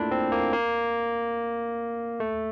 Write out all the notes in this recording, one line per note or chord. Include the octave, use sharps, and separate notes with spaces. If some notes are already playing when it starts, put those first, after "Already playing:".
Already playing: A3 A#3 D4 E4 F4
C4
A#3
A#3
A3